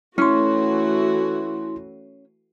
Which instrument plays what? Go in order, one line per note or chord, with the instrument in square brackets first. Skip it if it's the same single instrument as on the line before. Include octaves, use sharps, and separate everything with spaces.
[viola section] E3 A3 F#4 [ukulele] C#4 [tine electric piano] E4 C6